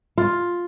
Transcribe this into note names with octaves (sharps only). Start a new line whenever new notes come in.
F4